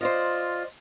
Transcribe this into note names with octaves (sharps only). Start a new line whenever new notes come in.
F4 C5 D5 D#5